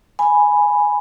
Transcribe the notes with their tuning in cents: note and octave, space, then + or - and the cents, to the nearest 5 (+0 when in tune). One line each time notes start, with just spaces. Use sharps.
G#5 +0 B5 +0